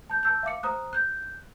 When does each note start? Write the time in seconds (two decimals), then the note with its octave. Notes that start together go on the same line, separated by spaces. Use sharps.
0.10 A5 G6
0.23 A5 E6 G6
0.43 E5 F5 D6 C#7
0.63 C5 A#5 D#6 F#6
0.93 F#6 G6